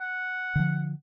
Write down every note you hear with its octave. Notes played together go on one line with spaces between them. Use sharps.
F#5
D3 F3